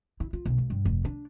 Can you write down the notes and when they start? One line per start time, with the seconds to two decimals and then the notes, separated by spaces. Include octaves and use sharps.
0.20 E4
0.33 F4
0.45 B1
0.58 C#2
0.70 G2
0.85 F1
1.05 D4